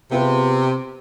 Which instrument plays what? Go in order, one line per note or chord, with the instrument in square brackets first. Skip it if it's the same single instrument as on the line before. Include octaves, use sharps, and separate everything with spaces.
[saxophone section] C3 [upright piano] B3 F4 G#4 B4